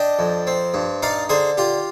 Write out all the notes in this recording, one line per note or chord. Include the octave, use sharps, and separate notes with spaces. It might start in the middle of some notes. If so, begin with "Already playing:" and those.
Already playing: D4 D#5 G5
F2
C4
G2
D#4 D5 F5
D3 G#4 C5
F4 G4